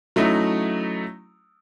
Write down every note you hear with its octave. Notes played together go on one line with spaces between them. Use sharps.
F#3 A3 C#4 D#4 E4